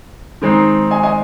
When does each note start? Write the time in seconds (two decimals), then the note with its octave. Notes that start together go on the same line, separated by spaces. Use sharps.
0.42 D#3 G#3 C4 D#4
0.91 D#5 G#5
1.03 D#5 G#5